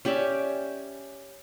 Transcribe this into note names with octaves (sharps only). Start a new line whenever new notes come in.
C#4 G4 D5 E5